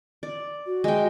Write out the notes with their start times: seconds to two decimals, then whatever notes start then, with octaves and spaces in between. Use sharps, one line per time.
0.23 D5
0.66 F#4
0.84 G#3 G5